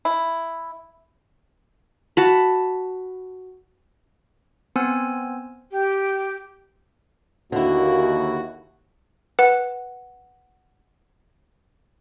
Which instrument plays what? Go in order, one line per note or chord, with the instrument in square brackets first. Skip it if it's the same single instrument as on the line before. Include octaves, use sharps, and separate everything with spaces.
[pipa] E4
[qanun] F#4 A5 B5
[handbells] B3 C4 C5 G#5 E6
[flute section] G4
[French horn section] D#2 [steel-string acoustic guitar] D3 E4 [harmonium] F#4
[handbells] B4 [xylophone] F#5